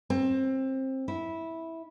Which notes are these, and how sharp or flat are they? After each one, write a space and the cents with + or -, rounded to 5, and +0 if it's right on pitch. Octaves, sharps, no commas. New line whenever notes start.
C4 +20
E4 -10